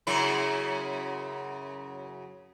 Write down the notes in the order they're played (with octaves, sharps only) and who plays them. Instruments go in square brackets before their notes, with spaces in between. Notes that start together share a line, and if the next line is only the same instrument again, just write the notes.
[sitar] F#2 C#3 E4